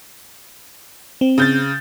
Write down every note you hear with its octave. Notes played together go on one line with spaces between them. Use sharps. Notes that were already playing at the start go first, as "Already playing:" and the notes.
C4
C#3 G6 A6